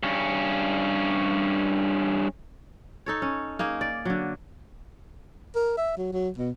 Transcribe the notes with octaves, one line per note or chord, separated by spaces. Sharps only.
G2 C#4
D#4 A4 C#5
C#4
A#3 D#4 G#4
D5
D3 F#3
A#4
E5
F#3
F#3
B2